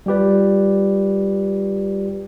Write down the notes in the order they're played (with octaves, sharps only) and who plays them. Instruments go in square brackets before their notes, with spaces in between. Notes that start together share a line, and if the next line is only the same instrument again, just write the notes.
[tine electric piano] G3 F4 G4 B4 D5